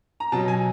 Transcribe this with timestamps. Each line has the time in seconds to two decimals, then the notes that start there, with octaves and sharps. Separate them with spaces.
0.20 A#5
0.32 B2 F#3 A5
0.48 G#5